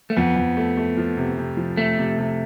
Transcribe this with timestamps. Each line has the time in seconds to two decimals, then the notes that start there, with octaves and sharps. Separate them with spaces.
0.10 A3
0.16 F2 B3
0.36 F2
0.57 A3
0.77 A3
0.97 F3
1.17 C3
1.38 C3
1.57 F3
1.77 C3 A3
1.98 C3
2.18 C3